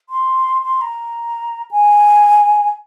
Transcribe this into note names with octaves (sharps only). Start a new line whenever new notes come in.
C6
C6
A#5
G#5